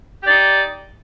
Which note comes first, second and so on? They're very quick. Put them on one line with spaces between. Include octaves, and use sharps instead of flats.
G4 D5 D#4